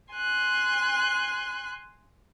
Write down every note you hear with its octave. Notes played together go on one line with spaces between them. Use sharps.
G#5 C6 F#6